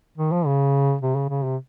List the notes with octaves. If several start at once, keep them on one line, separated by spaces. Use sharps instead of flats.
D#3
F3
C#3
C3
C#3
C#3
C3